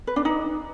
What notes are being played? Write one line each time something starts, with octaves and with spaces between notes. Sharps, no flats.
B4
D4
D#4